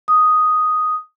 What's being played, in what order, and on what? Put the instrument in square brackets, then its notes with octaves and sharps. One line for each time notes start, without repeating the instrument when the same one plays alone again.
[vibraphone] D#6